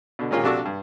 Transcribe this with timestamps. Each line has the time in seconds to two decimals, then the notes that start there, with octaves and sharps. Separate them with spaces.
0.19 B2 D3
0.31 A#2 G#3 A#3 C#4 F4 G4
0.43 A#1 C3 D4 F#4 A4 C#6
0.65 G2